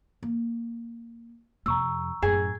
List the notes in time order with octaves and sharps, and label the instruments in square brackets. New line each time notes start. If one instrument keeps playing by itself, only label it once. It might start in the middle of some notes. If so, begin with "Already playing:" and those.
[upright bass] A#3
[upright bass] F2 C3 [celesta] A#5 C#6 E6
[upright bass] F#2 A2 [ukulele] G#4